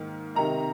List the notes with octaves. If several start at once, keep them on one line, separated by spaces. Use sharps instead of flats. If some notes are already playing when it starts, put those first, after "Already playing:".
Already playing: G#2 D#3 A#3
C3 D#3 A#3 D#4 A#5